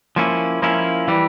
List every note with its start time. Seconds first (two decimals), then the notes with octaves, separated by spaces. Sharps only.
0.16 F3 A#3 C#4 E4
0.62 F3 A#3 C#4 E4
1.08 E3 G3